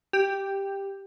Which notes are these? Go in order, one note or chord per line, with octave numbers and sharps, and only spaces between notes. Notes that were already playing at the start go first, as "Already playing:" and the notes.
G4